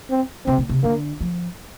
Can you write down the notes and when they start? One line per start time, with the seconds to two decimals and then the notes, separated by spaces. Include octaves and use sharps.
0.10 C4
0.46 C3 C4
0.58 A#2
0.69 C3
0.83 D3 A#3
1.21 F3